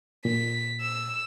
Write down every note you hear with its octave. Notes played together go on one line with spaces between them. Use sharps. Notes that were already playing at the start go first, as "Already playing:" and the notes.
A#2 B6
E6